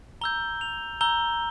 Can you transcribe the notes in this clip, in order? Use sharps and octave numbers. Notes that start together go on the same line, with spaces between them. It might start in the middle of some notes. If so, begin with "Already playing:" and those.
A#5 E6 G6 G7
F7
A#5 E6 G6 G7